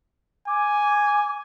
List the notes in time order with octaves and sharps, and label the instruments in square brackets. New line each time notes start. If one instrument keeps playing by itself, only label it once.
[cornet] G#5 [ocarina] D6